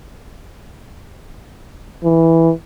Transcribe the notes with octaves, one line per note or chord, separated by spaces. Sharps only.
E3